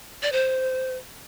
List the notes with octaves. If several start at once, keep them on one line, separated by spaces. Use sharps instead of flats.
D5
C5